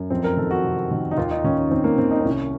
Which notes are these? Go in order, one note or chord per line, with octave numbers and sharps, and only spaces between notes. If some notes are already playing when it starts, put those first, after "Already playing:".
Already playing: F#2
F2 C4
A#4
D#3 A4
F#4
C3
D#3
D#4
D#2 F4
D#4
D#3 C#4
C#4
D#2 C4
A#3
D#3 C4
D#4
C4
C2 C#4